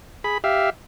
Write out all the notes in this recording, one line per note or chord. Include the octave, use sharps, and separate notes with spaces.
G#4 B5
G4 E5 F5